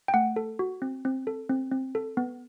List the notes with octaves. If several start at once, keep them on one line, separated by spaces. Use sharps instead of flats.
G5
A3 F#5
A4
F#4
C4
C4
A4
C4
C4
A4
B3